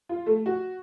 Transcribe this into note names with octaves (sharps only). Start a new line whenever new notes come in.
F4
A3
F#4